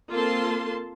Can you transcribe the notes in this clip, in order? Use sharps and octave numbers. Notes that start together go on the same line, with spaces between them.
A#3 C4 F4 A4 A5 C6